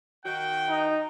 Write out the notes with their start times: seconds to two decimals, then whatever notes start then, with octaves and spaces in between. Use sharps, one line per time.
0.25 D#3 F#4 G5
0.69 D#4